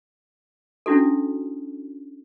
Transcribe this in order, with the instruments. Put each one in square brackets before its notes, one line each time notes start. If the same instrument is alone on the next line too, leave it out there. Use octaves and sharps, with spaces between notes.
[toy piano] C#4 D4 E4 F#4 A4